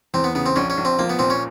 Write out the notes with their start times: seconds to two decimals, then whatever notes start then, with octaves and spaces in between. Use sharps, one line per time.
0.14 E2 C4
0.24 B3
0.35 C#3 B3
0.46 C4
0.56 A#1 C#4
0.70 C#4
0.78 A#1
0.85 C4
0.99 F3 A#3
1.10 B3
1.19 A#2 C4
1.30 C#4